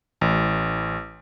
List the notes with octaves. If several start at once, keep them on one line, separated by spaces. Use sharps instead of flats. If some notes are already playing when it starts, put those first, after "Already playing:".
A1